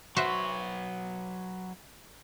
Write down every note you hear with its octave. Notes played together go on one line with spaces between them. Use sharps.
F#3 F#4 B4 C5 E5